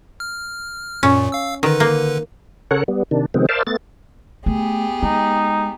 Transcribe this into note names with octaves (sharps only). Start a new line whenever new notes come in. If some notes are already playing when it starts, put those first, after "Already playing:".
F6
F#2 A#2 C#4
F5 E6
D3 D#3 B4
A#3
C#3 A4 A#4 C#5 F#5 F#6
G3 B3
C3 D#3 D4
C3 D#3 F3 G#3 B3 C4
A#4 C5 D5 E5 F5 A5
A3 B3 A6
A3 B3 G4 G#4
G#3 D#4